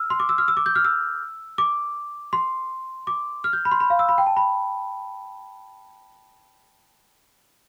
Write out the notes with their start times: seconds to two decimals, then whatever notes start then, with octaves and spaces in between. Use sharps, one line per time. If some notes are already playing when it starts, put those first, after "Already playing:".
Already playing: E6 F6
0.10 C6
0.20 D6
0.29 E6
0.38 F6
0.48 E6
0.57 D6
0.66 G6
0.75 F6
0.85 E6
1.58 D6
2.33 C6
3.07 D6
3.44 F6
3.53 G6
3.65 B5
3.71 C6
3.80 B5
3.90 F5
3.99 E6
4.09 B5
4.18 G5
4.26 A5
4.37 B5